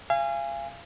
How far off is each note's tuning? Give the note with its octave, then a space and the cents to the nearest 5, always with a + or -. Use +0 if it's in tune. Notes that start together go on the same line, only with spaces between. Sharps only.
F5 -35 G#5 -15